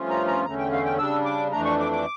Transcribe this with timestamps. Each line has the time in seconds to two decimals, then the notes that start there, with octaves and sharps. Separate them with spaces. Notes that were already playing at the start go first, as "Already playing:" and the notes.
Already playing: G2 F3 A3 C#4 F4
0.10 A#5
0.27 A#5
0.45 E2 D3 A3 C#4 A#5
0.58 G5
0.73 F5
0.85 G5
0.98 C#3 G3 D4 E6
1.25 D6
1.52 F2 E3 A3 D4 A#5
1.65 C#6
1.80 D6
1.92 D6